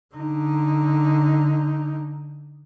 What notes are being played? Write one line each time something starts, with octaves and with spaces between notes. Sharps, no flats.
D3 D#4